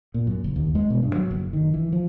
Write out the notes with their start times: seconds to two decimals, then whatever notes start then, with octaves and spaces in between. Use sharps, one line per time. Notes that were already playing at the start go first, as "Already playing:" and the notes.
0.14 A#2
0.27 F#2
0.44 F#1
0.56 D#2
0.75 G#3
0.90 B2
1.03 G2
1.15 F#3
1.31 F#1
1.53 D#3
1.74 E3
1.92 F3